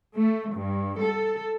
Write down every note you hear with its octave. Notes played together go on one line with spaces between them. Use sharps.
A3
G2
A4